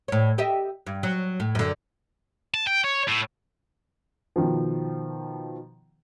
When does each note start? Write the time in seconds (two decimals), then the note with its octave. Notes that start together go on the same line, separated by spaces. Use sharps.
0.08 A2 C#5
0.38 G4 D#5 E5
0.87 G2
1.03 F#3
1.40 A2
1.55 F#2 D3
2.54 A5
2.67 G5
2.84 C#5
3.08 A2
4.36 B2 D#3 F3